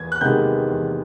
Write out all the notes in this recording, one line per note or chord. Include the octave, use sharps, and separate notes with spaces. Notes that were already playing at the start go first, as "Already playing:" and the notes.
Already playing: E2 G#6
F#6
C3 D#3 G#3 B3 G6
E2